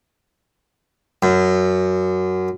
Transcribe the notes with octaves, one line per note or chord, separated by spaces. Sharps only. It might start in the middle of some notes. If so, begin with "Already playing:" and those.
F#2